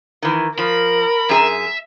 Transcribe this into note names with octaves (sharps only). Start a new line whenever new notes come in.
D#3 E3
F3 A#4 B5
F#2 G#4 E5 A#5